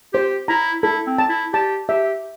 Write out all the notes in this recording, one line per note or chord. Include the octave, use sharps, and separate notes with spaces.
G4 C5
E4 A#5
E4 A4
C4
A5
E4
G4 A5
G4 E5